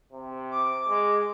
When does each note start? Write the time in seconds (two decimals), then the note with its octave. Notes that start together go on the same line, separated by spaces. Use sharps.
0.13 C3
0.51 D6
0.88 G#3